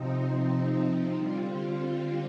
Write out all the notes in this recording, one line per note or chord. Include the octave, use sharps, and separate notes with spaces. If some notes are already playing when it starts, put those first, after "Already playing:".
Already playing: C3 F3 C4 D#4
D3 G3 C4 F4
F4